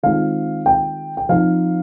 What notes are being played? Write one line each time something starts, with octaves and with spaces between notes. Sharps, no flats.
D#3 G#3 C4 F4 F5
G5
G5
F3 C4 D#4 F5